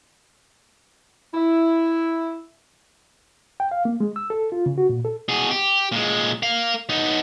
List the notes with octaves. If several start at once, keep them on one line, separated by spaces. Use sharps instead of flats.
E4
G5
F5
A#3
G#3
E6
A4
F4
C#3
F#4
A#2
A4
B2 G#4
G4
A#2 G#3
A#4 F5
B3 D#4